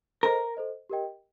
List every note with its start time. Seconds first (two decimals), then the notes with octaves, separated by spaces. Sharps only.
0.23 A4 A#4 C5 D#5
0.57 A4 C5 D#5
0.90 G4 A#4 D#5 G5